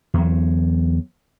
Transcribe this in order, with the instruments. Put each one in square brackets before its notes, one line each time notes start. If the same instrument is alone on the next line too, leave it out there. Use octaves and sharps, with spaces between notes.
[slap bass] E2 F#3